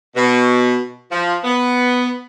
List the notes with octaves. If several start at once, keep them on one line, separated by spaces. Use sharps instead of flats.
B2
F3
B3